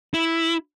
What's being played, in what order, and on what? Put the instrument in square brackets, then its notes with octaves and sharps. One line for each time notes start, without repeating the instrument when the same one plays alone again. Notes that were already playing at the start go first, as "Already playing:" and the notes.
[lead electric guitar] E4